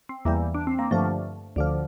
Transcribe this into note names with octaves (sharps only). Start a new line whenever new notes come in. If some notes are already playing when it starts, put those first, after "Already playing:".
C4
E2 E3 G3 A#3
D4
C4
A#3
G2 D3 F3 A3
D2 D3 F3